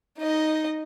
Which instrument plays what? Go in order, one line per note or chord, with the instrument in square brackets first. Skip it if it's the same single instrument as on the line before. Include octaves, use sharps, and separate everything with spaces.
[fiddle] D#4 D#5